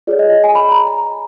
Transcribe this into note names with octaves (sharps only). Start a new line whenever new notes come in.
F4 G#4 C#5 D5
D#5
G#5
B5
A#5
A#5